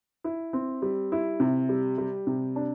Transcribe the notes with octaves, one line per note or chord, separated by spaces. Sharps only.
E4
C4
G3
E4
C3
G3
G3
C3
D4